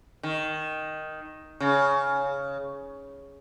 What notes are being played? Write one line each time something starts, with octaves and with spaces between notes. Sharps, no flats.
D#3
C#3